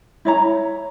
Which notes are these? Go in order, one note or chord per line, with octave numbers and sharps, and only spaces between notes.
E4 C#5 A#5